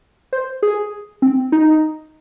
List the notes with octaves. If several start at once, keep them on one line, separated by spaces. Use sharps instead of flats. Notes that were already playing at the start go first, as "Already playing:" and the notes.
C5
G#4
C4
D#4